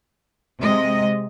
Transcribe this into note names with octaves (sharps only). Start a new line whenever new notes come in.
C3 G#3 D#5